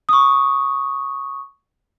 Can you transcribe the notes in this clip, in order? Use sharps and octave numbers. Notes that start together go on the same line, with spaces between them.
C#6 D#6